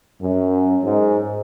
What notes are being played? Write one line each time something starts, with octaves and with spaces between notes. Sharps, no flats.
F#2
G#2